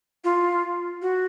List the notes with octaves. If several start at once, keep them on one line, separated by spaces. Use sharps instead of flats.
F4
F#4